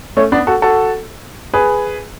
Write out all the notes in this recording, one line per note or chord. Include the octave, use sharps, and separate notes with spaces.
A3 C#4
B3 D4
F#4 A4
F#4 A4
G#4 B4